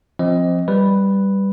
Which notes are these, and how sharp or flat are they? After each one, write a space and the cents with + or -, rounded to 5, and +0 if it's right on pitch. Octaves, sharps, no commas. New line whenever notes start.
F3 +0 C4 +15 D#5 +10
G3 +0 B4 +0